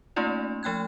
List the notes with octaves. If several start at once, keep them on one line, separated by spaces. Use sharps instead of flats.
A3 A#3 C#4 D#4 F4 D5
F3 A3 G5 F#6 G#6